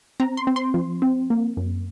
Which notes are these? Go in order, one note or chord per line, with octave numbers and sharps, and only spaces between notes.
C4 A#5
C6
C4
C6
F3
C4
A#3
F#2